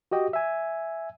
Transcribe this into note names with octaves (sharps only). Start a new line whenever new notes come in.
F#4 G4 D#5 G5
E5 G#5